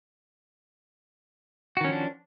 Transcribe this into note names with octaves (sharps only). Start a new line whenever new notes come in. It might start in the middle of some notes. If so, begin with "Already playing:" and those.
D#3 F3 C#4 D4 F#4